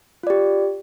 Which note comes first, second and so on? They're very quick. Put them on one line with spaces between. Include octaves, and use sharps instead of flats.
F4 D5 G4